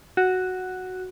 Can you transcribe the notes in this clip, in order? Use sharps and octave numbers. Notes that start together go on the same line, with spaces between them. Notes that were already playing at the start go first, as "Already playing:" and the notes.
F#4